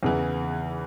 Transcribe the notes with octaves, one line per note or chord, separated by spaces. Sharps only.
E2 C#3 E3